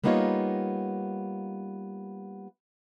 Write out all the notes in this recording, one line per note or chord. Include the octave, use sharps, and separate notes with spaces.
G3 A#3 B3 D#4 F4 C#5